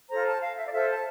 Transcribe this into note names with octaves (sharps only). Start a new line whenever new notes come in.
F4 A4 C5 A#5
A5
F5
E5
D5
F4 A4 C5 E5
A5